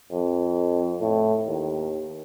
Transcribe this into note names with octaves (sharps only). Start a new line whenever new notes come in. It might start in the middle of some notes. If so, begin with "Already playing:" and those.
F2
A2
D#2